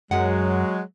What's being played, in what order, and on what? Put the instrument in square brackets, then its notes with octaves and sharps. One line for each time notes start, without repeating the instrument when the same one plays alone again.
[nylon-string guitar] F#2 F#5 [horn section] F#3 G#3